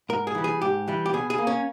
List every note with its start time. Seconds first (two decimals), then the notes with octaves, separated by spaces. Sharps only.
0.09 G#2 A#4
0.27 G#4
0.35 E3 G3
0.44 G#4
0.61 G#2 G4
0.88 E3 G3
1.06 G4
1.13 B2 G#4
1.30 G#4
1.38 A#3
1.47 C#4